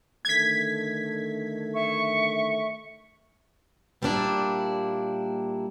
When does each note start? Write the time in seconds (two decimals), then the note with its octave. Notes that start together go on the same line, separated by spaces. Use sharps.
0.25 D3 D#3 A3 G#6 B6
1.74 E5 C#6
4.02 A#2 G3 A#3 C4 D4 E4